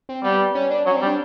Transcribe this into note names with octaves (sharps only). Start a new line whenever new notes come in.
C4
G3 B3
C#4
D4
F#3 C#4
C4
G3
D4